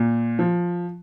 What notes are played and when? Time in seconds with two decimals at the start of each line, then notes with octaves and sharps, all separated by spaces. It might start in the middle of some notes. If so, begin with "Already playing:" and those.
Already playing: A#2
0.39 F3